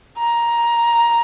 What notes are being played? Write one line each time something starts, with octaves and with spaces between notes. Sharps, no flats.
A#5